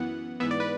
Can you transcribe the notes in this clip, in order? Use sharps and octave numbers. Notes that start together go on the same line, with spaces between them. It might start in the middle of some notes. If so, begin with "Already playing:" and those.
Already playing: F#2 E3 B3 F#5
G#2 E3 B3 E5
D5
B4